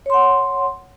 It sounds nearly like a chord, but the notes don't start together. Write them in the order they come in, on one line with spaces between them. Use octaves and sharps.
C#5 C6 F#5